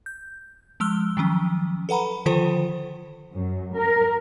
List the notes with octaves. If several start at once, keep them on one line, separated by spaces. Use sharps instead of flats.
G6
F3 G#3 E6 F6 G7
D#3 F3 F#3 C#4
A4 B4 F#5 A#5 B5
D3 D#3 F3 F4 A4 C5
F#2
A#4